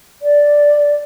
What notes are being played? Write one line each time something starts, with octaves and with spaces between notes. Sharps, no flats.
D5